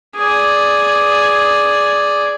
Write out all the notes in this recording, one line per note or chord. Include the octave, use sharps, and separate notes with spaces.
G#4 D5